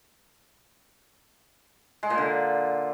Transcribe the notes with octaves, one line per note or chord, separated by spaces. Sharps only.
G#3
A#2
D3